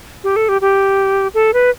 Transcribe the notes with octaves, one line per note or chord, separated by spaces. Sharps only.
G4
A4
G4
G4
A4
B4